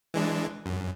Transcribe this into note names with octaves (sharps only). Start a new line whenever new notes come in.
E3 G#3 D4
F#2